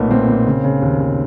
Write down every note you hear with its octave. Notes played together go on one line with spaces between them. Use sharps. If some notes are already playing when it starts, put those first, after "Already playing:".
Already playing: B1 A#2 A3 B3
A#2 A#3 C4
A#2
C#3
C#3
D#2
D#2